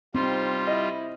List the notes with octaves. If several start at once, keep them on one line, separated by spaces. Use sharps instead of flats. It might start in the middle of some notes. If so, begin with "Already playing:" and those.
G3 C4 D#4 F4 C6
E4 D#5